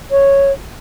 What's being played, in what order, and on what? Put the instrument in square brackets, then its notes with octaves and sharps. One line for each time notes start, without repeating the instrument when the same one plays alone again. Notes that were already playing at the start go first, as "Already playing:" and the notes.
[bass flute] C#5